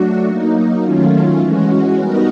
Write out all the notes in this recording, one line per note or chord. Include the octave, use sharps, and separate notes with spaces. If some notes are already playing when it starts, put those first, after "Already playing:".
Already playing: F#3 A3 D4 F#4
F#3 A#3 D#4
D#3 F#3 A3 C#4 F4
E3 G#3 C#4 F#4
G3 B3 D#4 F#4 A#4